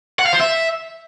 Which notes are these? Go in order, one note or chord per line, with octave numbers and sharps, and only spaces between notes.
F#5
F5
C5
E5